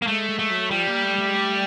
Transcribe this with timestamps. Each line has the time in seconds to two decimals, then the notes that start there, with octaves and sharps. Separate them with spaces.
0.02 A#3
0.07 G#3 A3
0.29 G#3
0.39 A3
0.50 F#3
0.71 F3 G3
0.87 A#3
1.03 A3
1.19 A3
1.27 G#3
1.34 A3